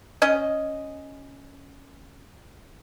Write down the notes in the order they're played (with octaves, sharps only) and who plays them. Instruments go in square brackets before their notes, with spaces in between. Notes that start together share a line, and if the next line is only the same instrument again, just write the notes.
[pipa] C#4 D#5